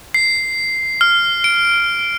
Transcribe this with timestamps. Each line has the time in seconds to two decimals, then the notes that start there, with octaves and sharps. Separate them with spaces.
0.14 C7
1.01 F6
1.44 D7